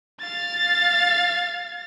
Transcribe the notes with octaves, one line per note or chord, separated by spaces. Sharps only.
F5 A6